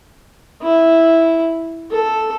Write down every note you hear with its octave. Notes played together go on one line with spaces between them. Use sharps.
E4
A4